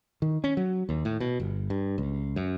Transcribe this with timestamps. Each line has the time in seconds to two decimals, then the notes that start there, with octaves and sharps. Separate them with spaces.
0.22 D#3
0.44 C#4
0.57 F#3
0.89 D#2
1.05 A2
1.20 B2
1.40 G1
1.70 G2
1.98 C#2
2.36 F#2